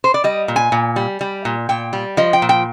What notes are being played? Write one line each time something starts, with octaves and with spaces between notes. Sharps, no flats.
C5
D5
G3 D#5
A#2
G#5
A#2
G3
G3
A#2
A#2 G5
G3
F3 D#5
G5
A#2
G5